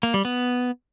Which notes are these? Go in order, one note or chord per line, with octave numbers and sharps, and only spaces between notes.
A#3
G3
B3